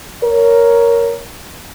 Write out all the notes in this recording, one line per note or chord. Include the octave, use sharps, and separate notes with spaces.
A#4 C#5